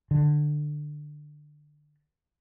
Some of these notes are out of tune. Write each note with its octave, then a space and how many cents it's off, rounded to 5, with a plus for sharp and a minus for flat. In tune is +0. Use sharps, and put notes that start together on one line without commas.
D3 +20